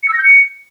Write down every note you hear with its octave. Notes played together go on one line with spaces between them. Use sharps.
C#7
E6
A#6
G6
C#7